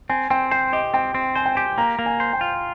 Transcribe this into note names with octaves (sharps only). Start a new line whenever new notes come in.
C4 G#5
C4 G5
C5 G5
G4 D#5
C4 G5
C4
C5 G#5
G5
G4 G#5
A#3 A#5
A#3
G#5
C5
G5
F4